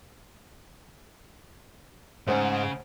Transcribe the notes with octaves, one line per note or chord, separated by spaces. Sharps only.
G#2 C#3 A3 C#4 C5 F#5